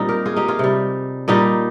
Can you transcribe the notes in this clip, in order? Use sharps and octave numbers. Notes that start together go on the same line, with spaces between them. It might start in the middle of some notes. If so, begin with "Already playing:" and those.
Already playing: A#2 G3 C4 D#4
G4 A#4
F4 G#4
D#4 G4
F4 G#4
C3 G3
A#2 G3 D#4 G4